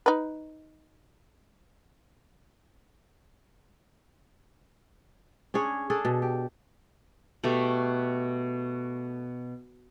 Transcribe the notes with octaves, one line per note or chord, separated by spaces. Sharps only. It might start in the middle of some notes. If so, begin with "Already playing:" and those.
D#4 B4
C#4 D4 G#4 C#5
D4 G#4 A4
B2
G4
B2 A3 G4